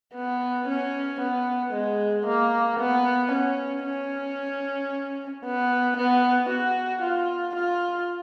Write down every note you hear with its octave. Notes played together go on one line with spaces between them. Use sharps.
B3
C#4
B3
G#3
A#3
B3
C#4
C#4
B3
B3
F#4
F4
F4